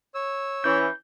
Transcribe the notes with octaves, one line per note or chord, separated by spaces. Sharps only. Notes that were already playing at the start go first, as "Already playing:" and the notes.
C#5 E6
E3 C#4 G6